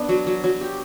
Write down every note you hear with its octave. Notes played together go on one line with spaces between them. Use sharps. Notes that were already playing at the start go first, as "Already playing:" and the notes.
Already playing: B3 D4
F#3
F#3
F#3
G4